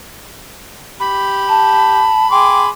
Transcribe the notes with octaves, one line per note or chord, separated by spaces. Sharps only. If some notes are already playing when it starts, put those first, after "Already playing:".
G4 B5
A5
G#4 G5 C6 D6